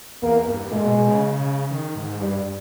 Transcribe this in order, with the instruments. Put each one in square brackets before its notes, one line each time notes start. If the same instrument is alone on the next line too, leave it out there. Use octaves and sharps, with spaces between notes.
[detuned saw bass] E2 [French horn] A#3
[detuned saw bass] G2
[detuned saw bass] A#2 [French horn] G#3
[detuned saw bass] B2
B2
C#3
D#3
G#2
[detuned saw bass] G2 [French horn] G3